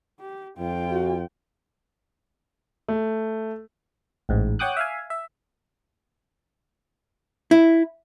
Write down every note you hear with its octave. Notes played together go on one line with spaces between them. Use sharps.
G4
F2 F4 G5
F#4
A3
A1 G#2
C#5 F#5 G5 D6 D#6 F#6
E5 F5 G#5
E5
E4